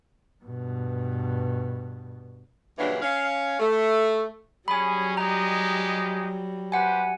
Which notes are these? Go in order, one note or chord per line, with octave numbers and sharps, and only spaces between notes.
G2 B2
G2 A#2 C#3 E3 F#3 D4
C#4 F5
A3
F#3 G3 C#4 G#4 G#5 B5
G#3 D#4 G4 A#5
G4 B4 C5 F#5 G#5